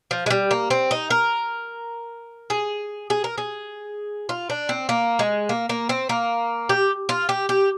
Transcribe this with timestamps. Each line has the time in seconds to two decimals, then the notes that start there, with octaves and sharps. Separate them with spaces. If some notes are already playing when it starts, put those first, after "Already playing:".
0.11 F3
0.26 G#3
0.30 G3
0.51 A#3
0.70 C4
0.91 D#4
1.10 A#4
2.50 G#4
3.10 G#4
3.24 A#4
3.38 G#4
4.29 F4
4.50 D4
4.69 C4
4.89 A#3
5.19 G#3
5.49 A#3
5.69 A#3
5.89 C4
6.09 A#3
6.69 G4
7.09 F4
7.29 G4
7.49 G4